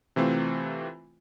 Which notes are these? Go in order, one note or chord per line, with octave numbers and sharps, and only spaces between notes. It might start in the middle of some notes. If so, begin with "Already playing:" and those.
C3 E3 A3 C4 F4